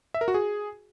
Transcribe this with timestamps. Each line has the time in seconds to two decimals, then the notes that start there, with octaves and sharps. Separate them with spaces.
0.14 E5
0.21 A#4
0.28 F#4
0.34 G#4